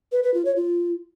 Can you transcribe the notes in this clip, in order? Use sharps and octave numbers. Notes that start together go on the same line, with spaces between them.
B4
B4
F4
C#5
F4